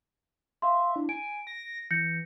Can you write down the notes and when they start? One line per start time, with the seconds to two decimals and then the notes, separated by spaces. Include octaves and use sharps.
0.62 E5 F5 C6
0.96 D4 E4
1.09 G#5 D7
1.47 A#6
1.91 E3 G6 A#6 C#7